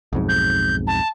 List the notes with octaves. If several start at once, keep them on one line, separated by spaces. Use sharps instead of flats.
B1 F2 G#2
G6
A5